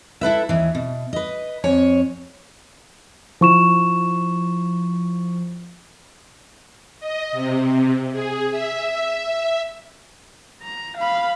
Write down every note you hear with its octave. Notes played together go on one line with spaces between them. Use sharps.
E4 A4 B4 E5
D#2 E3
B2
B4 D#5
F2 C#5 G#5
F3 E4 C#6 E7
D#5
C3
G#4
E5
A#5
F5 B5